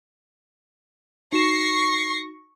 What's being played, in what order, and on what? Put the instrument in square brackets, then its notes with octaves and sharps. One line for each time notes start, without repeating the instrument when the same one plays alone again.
[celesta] D#4 F#4 E7 [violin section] C#6 A#6 C7